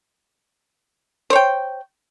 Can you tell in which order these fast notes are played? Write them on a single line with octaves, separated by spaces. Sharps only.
C5 C#5 G5